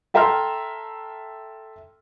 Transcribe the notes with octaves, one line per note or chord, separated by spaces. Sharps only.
A4 E5 G5 A#5 C6 F6